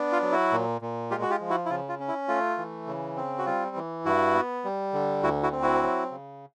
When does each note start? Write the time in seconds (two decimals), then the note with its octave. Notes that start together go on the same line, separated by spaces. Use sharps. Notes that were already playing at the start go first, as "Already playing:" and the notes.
Already playing: B3 D4
0.12 F4
0.23 F#3
0.32 E4 F#4
0.52 A#2
0.81 A#2
1.11 G#3 F4 G4
1.22 F#4
1.30 F4 G4
1.41 F3
1.50 E4 F#4
1.66 E4
1.70 C#3 F4
1.89 F4
2.00 C#4
2.08 E4
2.28 A3 F4
2.58 E3
2.87 C#3
3.16 C4
3.38 F#4
3.46 G3 F4
3.76 E3
4.05 G2 E4 F#4
4.34 B3
4.64 G3
4.93 D3
5.23 D2 E4 F#4
5.43 E4 F#4
5.52 C4
5.62 E4 F#4
5.83 F#3
6.11 C#3